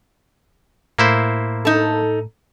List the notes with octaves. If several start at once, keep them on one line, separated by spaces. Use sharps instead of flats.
A2 A#3 E4 C5
D#4 A4